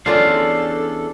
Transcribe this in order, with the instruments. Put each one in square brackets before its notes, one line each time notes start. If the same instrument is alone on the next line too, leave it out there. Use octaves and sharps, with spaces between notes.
[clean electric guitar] E2 D4 F5 [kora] C#4 F4 D5 [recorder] A4